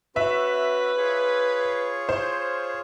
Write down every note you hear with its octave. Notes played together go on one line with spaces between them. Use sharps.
C#4 F#4 B4 E5
F4 G#4 C#5
C5